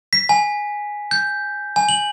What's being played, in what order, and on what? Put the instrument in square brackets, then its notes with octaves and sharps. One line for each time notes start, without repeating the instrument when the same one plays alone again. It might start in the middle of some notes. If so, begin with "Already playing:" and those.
[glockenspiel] B6
G#5
G6
G#5
F#7